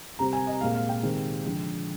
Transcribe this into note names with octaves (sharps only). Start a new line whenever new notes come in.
C3 G3 C4 A#5
G#5
D#5
A#2 G#3 C4 F5
F5
G5
C3 D#3 G#3 C4
D3 F3 G#3